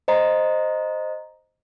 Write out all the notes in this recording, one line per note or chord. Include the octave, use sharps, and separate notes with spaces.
C5 D#5 A#5